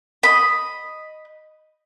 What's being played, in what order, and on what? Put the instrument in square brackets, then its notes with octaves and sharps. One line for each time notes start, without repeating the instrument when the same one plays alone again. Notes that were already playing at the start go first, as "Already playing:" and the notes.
[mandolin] D#5 B5